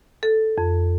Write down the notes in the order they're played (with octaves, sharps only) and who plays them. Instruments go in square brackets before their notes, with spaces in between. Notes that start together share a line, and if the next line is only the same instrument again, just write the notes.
[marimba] A4
F2